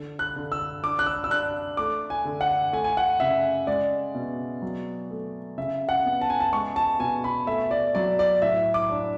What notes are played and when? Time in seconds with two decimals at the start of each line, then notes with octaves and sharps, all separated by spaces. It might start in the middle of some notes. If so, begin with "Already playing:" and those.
Already playing: D3
0.19 F#6
0.36 D3
0.52 E6
0.83 D4 D6
0.99 F#6
1.06 E6
1.24 E6
1.30 D4 F#6
1.77 A3 D6
2.10 G#5
2.25 D3
2.41 F#5
2.73 A3 G#5
2.84 G#5
2.97 F#5
3.20 C#3 E5
3.67 G#3 D5
4.15 B2
4.62 F#3
5.11 A3
5.58 C#3 E5
5.89 F#5
6.05 B3
6.21 A5
6.30 G#5
6.40 A5
6.53 G#3 C#6
6.76 A5
6.99 B2 G#5
7.24 B5
7.47 A3 E5
7.71 D5
7.95 F#3 D5
8.19 D5
8.42 A2 E5
8.74 D6
8.90 D4